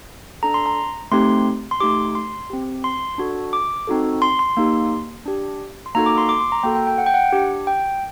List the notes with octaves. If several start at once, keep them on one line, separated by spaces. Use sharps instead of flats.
D4 A4 A#5
C6
A#5
A3 C4 D#4 G4 C6
C6
A3 D#4 G4 D6
C6
C4 G4
C6
D4 F#4 A4
D6
C4 D#4 F#4 A4
C6
C6
A#3 D#4 G4 C6
D4 G4
C6
A#3 D#4 F#4 A4 A#5
D6
C6
D6
C6
A#5
A#3 F#4 A4 G5
G5
G5
F#5
G5
F#5
D4 G4
G5